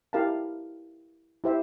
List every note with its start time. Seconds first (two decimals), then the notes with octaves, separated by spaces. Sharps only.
0.13 E4 G4 A#4 F5 A5
1.44 E4 G4 C5 E5